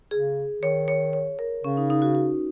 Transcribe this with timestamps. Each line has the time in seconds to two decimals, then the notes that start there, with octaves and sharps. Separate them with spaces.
0.11 C#3 G#4
0.62 D#3 C#5
0.88 C#5
1.13 C#5
1.39 A#4
1.64 C#3 C#4
1.77 D#4
1.90 D#4
2.02 F#4
2.15 F#4